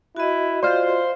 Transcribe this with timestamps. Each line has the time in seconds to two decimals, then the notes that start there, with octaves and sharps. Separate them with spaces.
0.16 E4 F#4 D#5
0.63 F4 C5 D5 F6